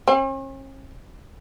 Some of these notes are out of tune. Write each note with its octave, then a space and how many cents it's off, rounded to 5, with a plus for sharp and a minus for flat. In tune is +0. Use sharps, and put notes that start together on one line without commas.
C#4 -45